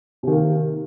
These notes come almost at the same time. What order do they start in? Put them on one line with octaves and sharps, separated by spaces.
C3 D#3 A#3